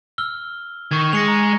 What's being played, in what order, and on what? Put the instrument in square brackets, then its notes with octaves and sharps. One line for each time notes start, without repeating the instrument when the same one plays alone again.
[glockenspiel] E6 F6 G7
[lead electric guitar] D#3 [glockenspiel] C#6 G#6
[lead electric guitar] G#3 [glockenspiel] A#6 C#7 F7
[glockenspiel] A#5